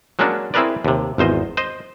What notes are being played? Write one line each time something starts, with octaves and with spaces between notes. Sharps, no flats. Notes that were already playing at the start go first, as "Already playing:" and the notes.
F#3 G#3 A#3 C#4 D4 F#4
C4 E4 G#4 A#4 B4 D5
D#2 C3
G#1 E2 C5 D#5
C5 D#5